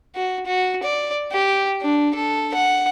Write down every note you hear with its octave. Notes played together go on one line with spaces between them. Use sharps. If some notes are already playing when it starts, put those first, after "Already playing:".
F#4
F#4
D5
G4
D4
A4
F#5